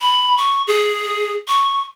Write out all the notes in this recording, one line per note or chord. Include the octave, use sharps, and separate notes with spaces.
B5
C#6
G#4
C#6